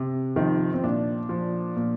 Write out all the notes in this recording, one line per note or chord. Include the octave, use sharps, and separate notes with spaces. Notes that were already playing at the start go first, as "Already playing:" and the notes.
Already playing: C3
D#3 F3 D#4
C4
A#2 D4
F3
A#2